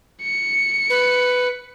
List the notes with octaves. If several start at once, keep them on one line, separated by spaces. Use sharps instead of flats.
C#7
B4